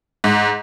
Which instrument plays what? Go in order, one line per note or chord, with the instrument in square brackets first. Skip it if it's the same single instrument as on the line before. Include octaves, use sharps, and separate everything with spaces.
[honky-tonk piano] G#2